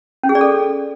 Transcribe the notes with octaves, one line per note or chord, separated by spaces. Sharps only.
C#4
G#4
D5
A4